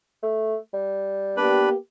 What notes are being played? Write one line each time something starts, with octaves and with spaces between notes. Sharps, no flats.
A3
G3
A#3 B3 D4 G4 B4